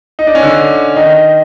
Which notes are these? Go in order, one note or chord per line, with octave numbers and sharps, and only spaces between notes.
D#4
D4
C#4
D3 D4
D#3 D#4